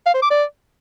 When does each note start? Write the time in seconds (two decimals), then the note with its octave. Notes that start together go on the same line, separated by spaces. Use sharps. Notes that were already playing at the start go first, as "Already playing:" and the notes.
0.06 F5
0.14 C5
0.22 D6
0.31 D5